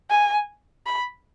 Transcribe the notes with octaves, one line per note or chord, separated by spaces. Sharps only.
G#5
B5